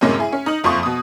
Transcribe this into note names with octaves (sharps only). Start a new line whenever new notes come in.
F#2 A2 C3 G#3 A#3 C#4
E4 G#4
C#4
D#4 D#6 F#7
F#1 F2 F3 C6 C#6 D#6
B2 D#6